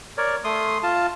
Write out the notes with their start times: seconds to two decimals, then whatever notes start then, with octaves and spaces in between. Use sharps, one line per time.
0.18 A#4 C#5 D5
0.44 A3 C6 D#6
0.83 F4 A5